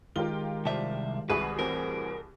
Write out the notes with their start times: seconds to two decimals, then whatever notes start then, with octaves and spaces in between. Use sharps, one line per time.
0.16 D#3 G#3 F4 G4 A#4 G7
0.65 C2 C5 D5 E5 A5
1.30 C2 F#4 G#4 B4 E5 B5 C#6
1.59 A1 E3 C4 A#4